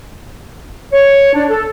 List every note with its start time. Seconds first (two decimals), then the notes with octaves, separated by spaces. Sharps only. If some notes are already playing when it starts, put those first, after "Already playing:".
0.92 C#5
1.34 D4
1.50 A4